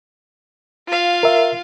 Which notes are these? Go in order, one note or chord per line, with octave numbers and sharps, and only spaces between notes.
F4 F5
A#4 E5